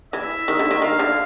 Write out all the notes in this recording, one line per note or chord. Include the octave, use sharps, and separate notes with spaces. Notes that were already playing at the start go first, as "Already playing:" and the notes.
E3 E5
D#3
D3
D#3
D#3 F5
D3